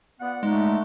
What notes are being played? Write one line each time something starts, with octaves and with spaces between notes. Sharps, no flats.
B3 F4 D5 F#5
G#3 A3 D#4